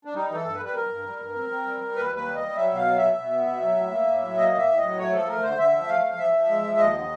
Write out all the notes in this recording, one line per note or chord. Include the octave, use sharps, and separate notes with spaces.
D4
G3 D#4
E3
A4
G2
B4
G3
B4
G2 A#4
G2
G3
G2
C4
C4
G3
G3
D#2 B4
D#2
B4
G3
D#5
G3
F#3 E5
B2
F5
F#3
B2 E5
B2
B3
B2
F#3
A2
A#3
A2
F#3
A#3 D#5
A2 E5
A2
F#3 D#5
A3 C#5
F3 A4
A3 A#4
D3 C5
D3 E5
F3
A3 F5
F3
F3 E5
F3
G#3
F3
D#2 D#5
D3